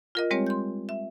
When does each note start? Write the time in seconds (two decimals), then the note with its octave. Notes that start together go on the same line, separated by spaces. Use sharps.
0.15 F4 A#4 D#5
0.31 G3 G#3 C4 G4 C#5
0.47 C6 G6
0.89 E5